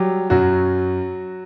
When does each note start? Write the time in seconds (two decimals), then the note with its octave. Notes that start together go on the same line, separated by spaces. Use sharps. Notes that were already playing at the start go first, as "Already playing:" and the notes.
Already playing: F#3 G3 G4
0.30 F#2 F#3 F#4